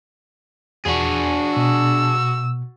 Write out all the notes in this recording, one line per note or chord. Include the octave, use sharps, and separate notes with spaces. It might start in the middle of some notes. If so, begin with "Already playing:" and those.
E2 D4 F#4 G#4
B2 E6